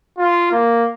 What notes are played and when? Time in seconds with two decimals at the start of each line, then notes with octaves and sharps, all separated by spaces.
0.18 F4
0.52 A#3